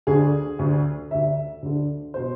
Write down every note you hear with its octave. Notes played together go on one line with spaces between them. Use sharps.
D2 D3 G#4
D2 D3
D2 D3 E5
D2 D3
B2 C5